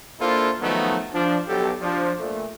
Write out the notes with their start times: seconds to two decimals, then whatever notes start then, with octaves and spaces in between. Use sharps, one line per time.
0.20 A#3 D4 E4 F4 A4 C5
0.61 D#3 F3 F#3 A3 B3 D#4
1.14 F3 D4
1.48 B1 G4 A4
1.81 F3 D4
2.19 A#2 A3